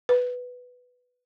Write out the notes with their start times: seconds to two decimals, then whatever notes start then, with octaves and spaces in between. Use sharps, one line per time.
0.09 B4